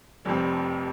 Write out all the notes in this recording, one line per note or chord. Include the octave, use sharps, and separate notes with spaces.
F1 F2 C3 G3 C4